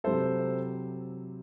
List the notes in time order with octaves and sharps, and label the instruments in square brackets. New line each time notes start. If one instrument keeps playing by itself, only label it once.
[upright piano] C3 F#3 C4 E4 G4 [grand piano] A4 C5